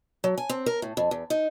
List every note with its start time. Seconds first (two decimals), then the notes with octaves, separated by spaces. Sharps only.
0.24 F#3
0.38 G#5
0.50 C4
0.66 A#4
0.82 A2
0.97 F2
1.11 E2
1.30 D#4